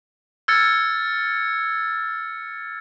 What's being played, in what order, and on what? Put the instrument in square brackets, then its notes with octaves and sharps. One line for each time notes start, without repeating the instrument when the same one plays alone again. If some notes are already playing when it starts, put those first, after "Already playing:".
[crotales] E6 F6 G#6 A6 C#7